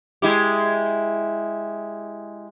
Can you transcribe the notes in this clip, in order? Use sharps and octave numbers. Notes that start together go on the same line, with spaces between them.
G#3 E4 G4